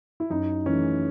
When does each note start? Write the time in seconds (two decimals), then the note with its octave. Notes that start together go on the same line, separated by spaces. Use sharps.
0.20 E4
0.30 F#2 D#4
0.66 E3 A3 C#4